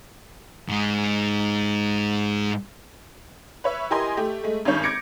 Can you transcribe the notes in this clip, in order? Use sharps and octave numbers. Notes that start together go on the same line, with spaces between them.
G#2 G#3
B4 C#5 E5
E4 G4 A#4 D#5 G#5 C6
A3 G4
G#3 A3
G#1 G2 D#3 C#4 C#5 G6
D6 G#6 A#6 C#7 D7